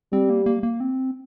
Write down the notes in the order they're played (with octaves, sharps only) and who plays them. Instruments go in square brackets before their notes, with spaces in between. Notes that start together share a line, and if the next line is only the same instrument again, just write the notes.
[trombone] G3 [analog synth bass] C4
[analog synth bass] A#3
A#3
A#3
C4